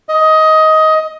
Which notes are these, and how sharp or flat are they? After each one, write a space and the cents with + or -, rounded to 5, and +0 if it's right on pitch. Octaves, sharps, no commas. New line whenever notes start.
D#5 +15